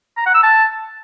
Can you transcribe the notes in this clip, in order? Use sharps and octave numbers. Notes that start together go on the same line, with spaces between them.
A#5
F#5
E6
A5